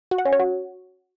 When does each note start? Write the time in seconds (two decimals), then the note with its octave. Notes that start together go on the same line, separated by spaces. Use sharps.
0.11 F#4
0.18 F#5
0.25 C#4
0.32 C#5
0.39 F#4